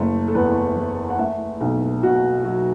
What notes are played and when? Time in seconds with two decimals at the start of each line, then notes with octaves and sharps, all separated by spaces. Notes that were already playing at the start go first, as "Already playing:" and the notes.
Already playing: F#1 A3
0.28 A4
0.34 E2 B4
0.76 E3
1.10 F#5
1.18 A3 E5
1.61 B1
2.02 B2 F#4
2.44 F#3